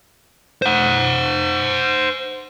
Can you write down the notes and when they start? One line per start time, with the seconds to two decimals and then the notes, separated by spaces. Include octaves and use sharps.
0.62 C5 F#5